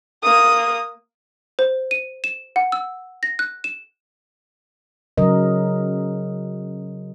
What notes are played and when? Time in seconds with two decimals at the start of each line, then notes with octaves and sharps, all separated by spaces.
0.24 A#3 D#6
1.59 C5
1.91 D#7
2.24 E7
2.56 F#5
2.72 E6
3.23 A#6
3.39 F#6
3.64 E7
5.18 C#3 F#3 A#4 D#5